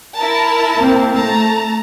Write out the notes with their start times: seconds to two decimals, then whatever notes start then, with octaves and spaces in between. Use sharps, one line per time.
0.15 E4 A#4 A5
0.75 A#3 C4
1.15 A3 A5 A#5